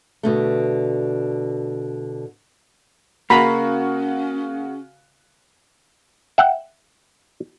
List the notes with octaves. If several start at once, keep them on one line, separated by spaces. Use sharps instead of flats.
B2 D3 A3
C#3 A#3 C#4 F#4 A#5 B5
E5 F#5 G5